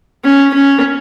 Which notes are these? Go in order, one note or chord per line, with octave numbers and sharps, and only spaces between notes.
C#4
C#4